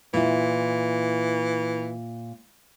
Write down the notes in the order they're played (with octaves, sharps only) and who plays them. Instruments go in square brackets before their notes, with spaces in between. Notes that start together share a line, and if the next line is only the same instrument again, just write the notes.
[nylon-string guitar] A#2 E4 [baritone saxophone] E3